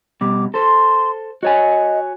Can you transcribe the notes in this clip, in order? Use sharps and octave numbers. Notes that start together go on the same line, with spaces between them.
B2 G3 D6
A4 C5 C6
F#4 C#5 D#5 G#5